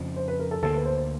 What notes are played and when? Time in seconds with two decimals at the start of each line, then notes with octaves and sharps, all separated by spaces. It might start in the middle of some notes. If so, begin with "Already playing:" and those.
Already playing: F2 C#3 F3
0.16 C5
0.28 B4
0.39 A#4
0.51 A4
0.62 D2 D3 G3 A#3 A4
0.75 B4
0.86 C5
0.98 C5